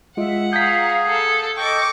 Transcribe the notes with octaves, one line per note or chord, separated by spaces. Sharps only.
G#3 F4 D#5 E5 F#5
G#4 F5 A#5 G6 B6
A4
A4 D#5 G5 C#6 D6